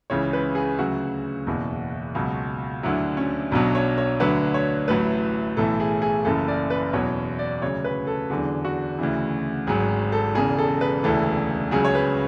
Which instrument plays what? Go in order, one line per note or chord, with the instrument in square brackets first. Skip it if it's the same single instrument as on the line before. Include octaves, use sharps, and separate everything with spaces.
[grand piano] C#2 C#3 E3 C#5
B4
G#4
D2 C#3 F#3 F#4
F#1 E2 B2
C#2 B2 F#3
D2 D3 F#3 E4
C#4
B1 B2 F#3 D4
C#5
C#5
D2 D3 F#3 B4
C#5
A1 A2 F#3 B4
B1 A2 E3 A4
G#4
G#4
F#1 F#2 C#3 E3 A4
D5
B4
E2 B2 F#3 C#5
D5
D2 C#3 F#3 C#5
B4
A4
E2 D3 F#3 G#4
F#4
D2 C#3 E3
G#1 G#2 F#3 G#4
A4
E1 E2 C#3 G#4
A4
B4
E1 D2 C#3 E3 A4
C#2 C#3 F#3 G#4
C#5
B4